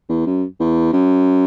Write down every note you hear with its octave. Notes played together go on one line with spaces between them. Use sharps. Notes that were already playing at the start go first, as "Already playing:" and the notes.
E2
F#2
E2
F#2